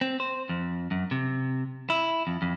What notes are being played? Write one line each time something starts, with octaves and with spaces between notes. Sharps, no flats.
C4
C5
F2
F#2
C3
E4
F2
F2